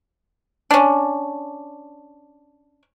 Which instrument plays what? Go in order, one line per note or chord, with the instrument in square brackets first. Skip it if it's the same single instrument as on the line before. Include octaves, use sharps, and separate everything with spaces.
[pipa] C#4 D4